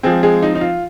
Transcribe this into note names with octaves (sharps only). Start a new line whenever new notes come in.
F3 G#3 C4 G#4
G#3 G#4
D#4
D#4
F4